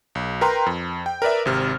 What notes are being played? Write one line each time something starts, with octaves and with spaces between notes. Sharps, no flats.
B1
A#4 B4 G5 A#5 C6
F2
G5
A#4 B4 D5 E5
G#1 C3 F6